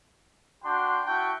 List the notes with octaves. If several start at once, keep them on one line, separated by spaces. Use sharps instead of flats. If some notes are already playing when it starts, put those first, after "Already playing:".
D4 F#4 G5 C6
E4 F#4 G5 A5 C#6